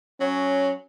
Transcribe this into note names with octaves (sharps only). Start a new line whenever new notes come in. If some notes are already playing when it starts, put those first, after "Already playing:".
F#3 C#4